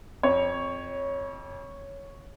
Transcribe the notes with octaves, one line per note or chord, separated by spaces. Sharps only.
F2 C#5